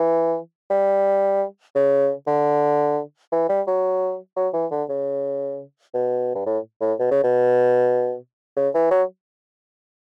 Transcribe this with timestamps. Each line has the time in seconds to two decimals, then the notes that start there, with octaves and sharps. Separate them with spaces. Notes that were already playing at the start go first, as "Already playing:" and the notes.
Already playing: E3
0.70 G3
1.75 C#3
2.27 D3
3.32 E3
3.49 G3
3.67 F#3
4.36 F#3
4.54 E3
4.71 D3
4.89 C#3
5.94 B2
6.35 G2
6.46 A2
6.81 A2
6.99 B2
7.11 C#3
7.23 B2
8.56 C#3
8.74 E3
8.90 F#3